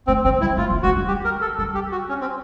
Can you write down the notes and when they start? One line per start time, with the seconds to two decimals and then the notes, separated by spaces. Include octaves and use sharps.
0.07 A3 C4
0.24 B3 C4
0.41 G3 E4
0.57 A3 F4
0.70 A#3
0.83 G#3 F#4
0.96 G3
1.08 G4
1.25 A#4
1.41 A4
1.58 G3 A4
1.75 G4
1.92 F#4
2.09 C#4
2.21 C4